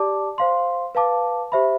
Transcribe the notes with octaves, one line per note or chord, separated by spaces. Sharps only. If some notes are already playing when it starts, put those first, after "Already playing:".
Already playing: G4 D5 A5 D6
C5 F5 C6
B4 F5 A5 D6
G4 C5 E5 B5